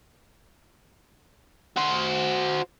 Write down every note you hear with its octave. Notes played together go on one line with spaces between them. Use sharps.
F#4 C5